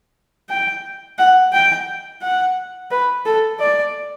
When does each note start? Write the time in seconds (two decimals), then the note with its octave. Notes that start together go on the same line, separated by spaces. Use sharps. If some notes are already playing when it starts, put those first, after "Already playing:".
0.49 G5
1.18 F#5
1.53 G5
2.22 F#5
2.91 B4
3.26 A4
3.60 D5